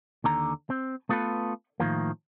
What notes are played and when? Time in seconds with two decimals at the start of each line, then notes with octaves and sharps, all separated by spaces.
0.24 D#2 D3 A#5
0.70 C4
1.09 A3 B3 F4 F#4 A4 B4
1.80 A2 D#3 F3 A#3